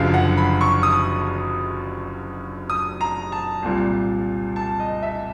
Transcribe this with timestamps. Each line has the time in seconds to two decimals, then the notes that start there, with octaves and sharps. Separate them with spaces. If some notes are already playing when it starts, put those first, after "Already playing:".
Already playing: F#1 F#2 D3 F3 F5
0.14 F#5
0.37 B5
0.61 C#6
0.83 D#6
2.70 D#6
3.01 A#5
3.32 A5
3.63 C2 A#2 G3
4.56 A5
4.80 D#5
5.03 E5